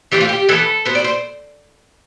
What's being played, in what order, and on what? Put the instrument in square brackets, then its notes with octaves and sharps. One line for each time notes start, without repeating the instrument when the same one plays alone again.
[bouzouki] E3 A3 C4 G4
F4
G4
E3 B3 A4
B2 B3 C5
D5
C5